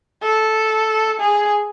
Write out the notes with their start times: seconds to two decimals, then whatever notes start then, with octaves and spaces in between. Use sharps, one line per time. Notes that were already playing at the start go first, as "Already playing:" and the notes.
0.23 A4
1.20 G#4